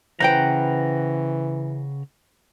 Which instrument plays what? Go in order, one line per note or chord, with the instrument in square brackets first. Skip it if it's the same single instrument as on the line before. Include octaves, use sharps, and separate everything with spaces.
[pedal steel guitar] C#3 F#5 A#5 [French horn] E3 [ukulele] B4 C5 G5